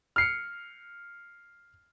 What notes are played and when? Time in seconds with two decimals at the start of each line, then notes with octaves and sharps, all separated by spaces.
0.16 F6 C7 C#7